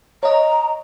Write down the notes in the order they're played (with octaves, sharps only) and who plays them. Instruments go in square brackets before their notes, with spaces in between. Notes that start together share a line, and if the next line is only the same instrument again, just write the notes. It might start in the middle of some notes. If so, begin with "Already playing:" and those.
[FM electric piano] C#5 D#5 [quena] A#5